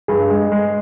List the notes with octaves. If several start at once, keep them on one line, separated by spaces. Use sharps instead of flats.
G2 G#4
G#3
G#3